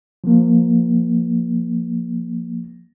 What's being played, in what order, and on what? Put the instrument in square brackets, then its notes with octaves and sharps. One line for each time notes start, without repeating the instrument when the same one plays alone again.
[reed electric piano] F3 A#3